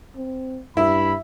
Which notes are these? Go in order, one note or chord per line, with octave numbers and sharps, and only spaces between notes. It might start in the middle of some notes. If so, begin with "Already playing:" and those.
C4
G2 E4 E5 B5